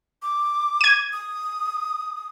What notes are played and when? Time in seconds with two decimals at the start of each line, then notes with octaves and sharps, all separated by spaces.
0.22 D6
0.81 G#6 D#7
1.12 D#6